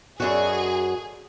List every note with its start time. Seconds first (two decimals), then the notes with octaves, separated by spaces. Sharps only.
0.20 F#2 F#4 G#4 A4 D5 D#5